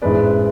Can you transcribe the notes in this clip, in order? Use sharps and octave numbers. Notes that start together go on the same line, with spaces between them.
A1 G#2 E3 G#3 D4 B4 D5